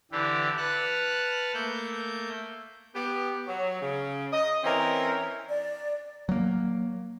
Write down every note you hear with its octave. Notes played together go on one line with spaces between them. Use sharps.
D3 E3 D4 E4 G4
B4 F#5 A5 F6 F#6
A3 A#3 G6
B3 G4
F#3
C#3
D#5
E3 C4 C#4 A#4
D5
F#3 A#3